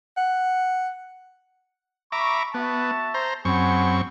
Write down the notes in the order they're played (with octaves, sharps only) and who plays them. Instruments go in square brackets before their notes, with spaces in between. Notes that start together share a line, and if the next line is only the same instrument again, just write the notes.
[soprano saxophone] F#5
[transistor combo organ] E5 A#5 D6 [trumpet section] B5 C#6
[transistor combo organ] B3 [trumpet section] F#4 E5 A5
[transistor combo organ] C5 A#5
[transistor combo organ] F#2 C4 C#6 [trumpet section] G#4 F#5 B5